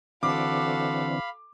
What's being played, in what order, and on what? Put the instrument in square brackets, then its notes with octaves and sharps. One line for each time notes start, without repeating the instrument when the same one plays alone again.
[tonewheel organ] D3 E3 C4 [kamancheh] F#4 A4 [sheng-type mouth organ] F5 B5 [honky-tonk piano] D6